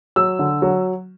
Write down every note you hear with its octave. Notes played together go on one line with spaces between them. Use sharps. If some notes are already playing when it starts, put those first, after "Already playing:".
F#3 E6
D3
F#3